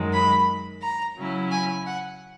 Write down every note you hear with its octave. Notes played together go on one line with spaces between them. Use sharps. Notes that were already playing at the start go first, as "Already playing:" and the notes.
Already playing: F#2 D#3 G#3
B5
A#5
C#3 F#3 C#4 E4
G#5
F#5